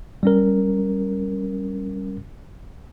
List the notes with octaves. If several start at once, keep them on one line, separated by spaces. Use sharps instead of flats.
G3 C#4 A#4